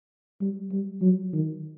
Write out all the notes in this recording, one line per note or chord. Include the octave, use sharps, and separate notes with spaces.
G3
G3
F#3
D#3